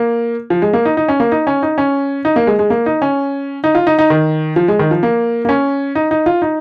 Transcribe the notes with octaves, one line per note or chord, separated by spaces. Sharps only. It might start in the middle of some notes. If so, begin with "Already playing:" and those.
Already playing: A#3
F3
G#3
A#3
D#4
D#4
C#4
A#3
D#4
C#4
D#4
C#4
D#4
A#3
G#3
G#3
A#3
D#4
C#4
D#4
F4
D#4
D#4
D#3
F3
G#3
D#3
F3
A#3
A#3
C#4
D#4
D#4
F4
D#4